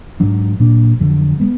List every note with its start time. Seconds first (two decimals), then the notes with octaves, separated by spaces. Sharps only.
0.20 G#2 F#3 D4
0.60 A#2 F#3 D4
1.00 F2 D3 F#3
1.40 G#3 B3